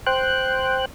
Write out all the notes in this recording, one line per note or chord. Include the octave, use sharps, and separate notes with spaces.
C5 G5 F#6